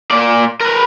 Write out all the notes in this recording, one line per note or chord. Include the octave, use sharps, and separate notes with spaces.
A#2 D5
A#4 B4